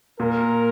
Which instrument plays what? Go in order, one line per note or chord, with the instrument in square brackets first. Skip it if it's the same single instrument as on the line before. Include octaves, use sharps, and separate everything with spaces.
[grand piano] A#2 [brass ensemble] A#4